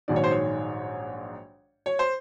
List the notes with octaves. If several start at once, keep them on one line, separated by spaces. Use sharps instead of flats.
A#1 G#2 D#3 F#3 D5
C#5
C5
C#5
C#5
C5